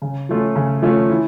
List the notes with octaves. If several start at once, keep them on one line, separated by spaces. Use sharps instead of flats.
C#3
F3 A3 C#4 F4
C#3
F3 A3 C#4 F4
E3